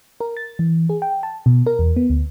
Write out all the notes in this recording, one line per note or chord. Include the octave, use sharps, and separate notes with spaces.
A#4
A6
E3
G#4
G5
A5
B2
A#4
E2
B3
D2